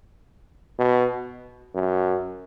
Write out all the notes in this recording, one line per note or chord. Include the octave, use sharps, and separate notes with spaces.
B2
F#2